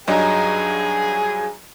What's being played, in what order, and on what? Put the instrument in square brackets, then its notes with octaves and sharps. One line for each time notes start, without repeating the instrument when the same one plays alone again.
[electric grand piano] G2 F#3 D4 [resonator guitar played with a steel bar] D#4 [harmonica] G#4 G#5